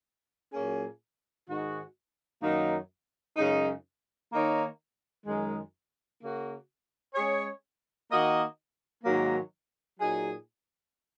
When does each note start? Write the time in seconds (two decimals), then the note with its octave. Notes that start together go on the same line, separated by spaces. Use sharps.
0.53 A#2 F#3 A#3 C#4 G#4
1.48 G#2 D#3 G#3 F#4
2.42 F#2 D#3 F#3 A#3 D#4
3.37 F#2 C#3 G#3 D#4
4.31 D#3 A#3 D#4 A#4 C#5
5.26 F#2 D#3 G#3
6.21 C#3 A#3 F#4
7.15 G#3 C#4 G#4 C#5
8.10 D#3 A#3 F#4 D#5
9.04 G#2 D#3 F#3 A#3
9.99 A#2 F#3 D#4 G#4